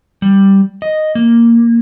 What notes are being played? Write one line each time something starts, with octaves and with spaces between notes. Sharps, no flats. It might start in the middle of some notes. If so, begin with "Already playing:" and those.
G3
D#5
A#3